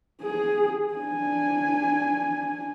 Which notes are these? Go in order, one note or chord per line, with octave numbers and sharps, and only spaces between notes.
G#4
D4 G#5